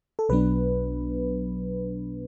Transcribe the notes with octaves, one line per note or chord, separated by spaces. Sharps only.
A4
B1 B2 F#3 B3 D4 B4